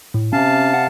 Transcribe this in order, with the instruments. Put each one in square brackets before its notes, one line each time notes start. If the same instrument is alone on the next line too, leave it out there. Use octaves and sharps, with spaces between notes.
[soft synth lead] A2
[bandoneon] C3 F5 A5 [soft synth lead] C#4
[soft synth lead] F#5